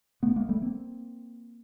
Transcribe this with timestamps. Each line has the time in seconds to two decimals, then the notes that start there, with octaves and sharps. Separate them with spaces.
0.23 A3 B3
0.36 G#3 A#3
0.49 G3 A3
0.62 A#3 C4